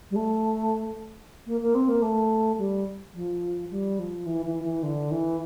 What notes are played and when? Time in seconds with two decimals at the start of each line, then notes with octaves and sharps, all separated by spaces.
0.11 G3
0.16 A3
1.47 A#3
1.61 A#3
1.75 C4
1.89 A#3
2.02 A3
2.58 G3
3.15 F3
3.71 G3
3.99 F3
4.26 E3
4.46 E3
4.64 E3
4.83 D3
5.11 E3